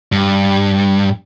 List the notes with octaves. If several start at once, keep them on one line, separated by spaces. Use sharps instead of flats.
G2